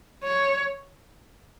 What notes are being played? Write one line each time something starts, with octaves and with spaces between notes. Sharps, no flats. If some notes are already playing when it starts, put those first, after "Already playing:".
C#5